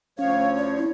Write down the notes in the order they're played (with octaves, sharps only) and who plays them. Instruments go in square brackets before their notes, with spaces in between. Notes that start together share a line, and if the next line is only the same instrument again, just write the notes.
[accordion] D2 F3 C#5 [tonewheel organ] C#4 [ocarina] F5
[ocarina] D5
E4